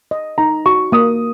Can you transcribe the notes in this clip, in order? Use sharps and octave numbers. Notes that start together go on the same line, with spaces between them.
D#5
D#4 A#5
F#4 C#6
A#3 D#6